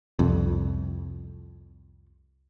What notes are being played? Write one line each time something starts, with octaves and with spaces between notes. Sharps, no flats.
C2 F2